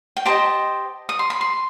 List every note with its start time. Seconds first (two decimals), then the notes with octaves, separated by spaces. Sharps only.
0.17 G5
0.25 G4 C5 D#5 A5
1.09 D#6
1.19 C6
1.30 B5
1.41 C6